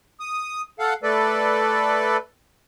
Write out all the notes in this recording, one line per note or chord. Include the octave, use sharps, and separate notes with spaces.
D#6
A4 F5 F#5
A3 A4 B4 D5